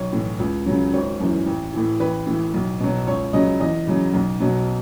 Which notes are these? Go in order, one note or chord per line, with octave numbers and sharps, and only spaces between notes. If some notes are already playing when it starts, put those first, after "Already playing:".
Already playing: B1 C#5
A2 E3
C#2
C#3 F#3
G#1 C#5
F#2 E3
A1
A2 E3
A1 B4
A2 E3
B1
B2 F#3
C#2 C#5
C#3 F#3 D#5
E2 D#5
C#3 F#3
B1
B2 F#3